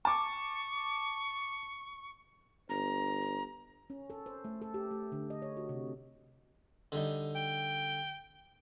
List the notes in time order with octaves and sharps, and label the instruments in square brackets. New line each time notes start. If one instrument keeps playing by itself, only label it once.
[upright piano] A5 D6 [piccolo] C#6
[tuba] G1 [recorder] A#5
[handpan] C#4
A4
C5
A3
A4
G4
A3
D3
D#5
C#5
F#4
C3
[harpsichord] D3 G3 D#4
[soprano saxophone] G5